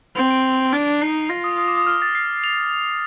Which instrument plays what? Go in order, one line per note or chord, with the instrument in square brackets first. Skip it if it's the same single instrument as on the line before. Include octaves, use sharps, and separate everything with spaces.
[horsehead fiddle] C4 [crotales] F7
[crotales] D7
[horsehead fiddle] D4
[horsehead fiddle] D#4 [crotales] C7
[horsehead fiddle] F4 [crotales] A#6
[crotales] D#6
D#6
D6
D#6
F6
A6
C7
F7